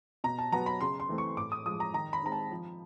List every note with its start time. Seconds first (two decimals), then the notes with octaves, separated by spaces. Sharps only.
0.24 B2 A#5
0.38 A5
0.52 F#3 B3 A#5
0.66 B5
0.81 C#3 C6
1.00 C6
1.09 E3 A3 C4
1.18 C#6
1.37 A2 D6
1.52 D#6
1.66 F3 G#3 D#6
1.80 A#5
1.94 D#3 A#5
2.13 B5
2.22 G#3 C4 D#4 A#5
2.32 A5
2.51 F3